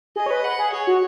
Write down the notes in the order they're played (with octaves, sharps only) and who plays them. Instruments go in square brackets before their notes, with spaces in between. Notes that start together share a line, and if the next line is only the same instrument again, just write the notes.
[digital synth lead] G#4 [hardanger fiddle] D#5
[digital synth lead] C#5
B4
[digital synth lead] B4 [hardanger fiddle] F#5
[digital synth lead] G#4
[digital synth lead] G#4 [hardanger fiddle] C#5
[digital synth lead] F#4